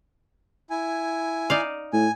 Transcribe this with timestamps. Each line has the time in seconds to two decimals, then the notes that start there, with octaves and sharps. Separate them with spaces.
0.70 E4 G#5
1.50 D#4 D5 F5
1.93 A2 G#5